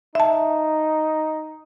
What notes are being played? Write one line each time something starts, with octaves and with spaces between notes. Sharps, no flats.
D#4 E5 A5